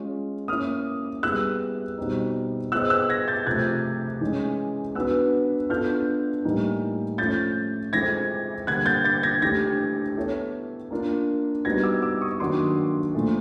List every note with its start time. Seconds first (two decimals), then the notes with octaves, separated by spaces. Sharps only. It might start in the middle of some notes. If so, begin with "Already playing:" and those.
Already playing: G#3 C#4 F4
0.48 A#3 C#4 E4 D#6 F6
1.23 G3 B3 E4 G#4 E6 F#6
1.98 B2 G3 C4 D#4
2.72 B3 E4 G#4 C5 D#5 E6 F#6
2.90 E6 F#6
3.09 G#6 A#6
3.28 G6 A6
3.46 C3 F3 A3 F#6 G#6
4.21 E3 G#3 C#4
4.95 B3 D4 F#4 B4 E6 F#6
5.70 B3 D4 F4 A4 F6 G6
6.45 A2 E3 G3 A#3 D#4
7.18 F3 A3 C#4 G6 A6
7.93 E3 G#3 C4 F4 A4 G#6 A#6
8.67 D3 G3 A#3 F#6 G#6
8.86 G6 A6
9.05 G6 A6
9.23 G#6 A#6
9.42 E3 A3 D4 G4 G#6 A#6
10.16 B3 E4 A4 C#5
10.91 A#3 D4 F4 A#4
11.65 G3 B3 D#4 F#4 B4 G#6 A#6
11.83 D6 E6
12.02 D6 E6
12.22 C#6 D#6
12.40 D#3 F#3 A#3 D4 F#4 C6 D6
13.14 A#2 F3 A3